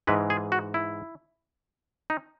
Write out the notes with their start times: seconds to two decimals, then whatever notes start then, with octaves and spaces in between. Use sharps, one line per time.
0.07 G#2 E3 G#3 B4
0.30 G#4
0.52 F#4
0.74 E4
2.10 D#4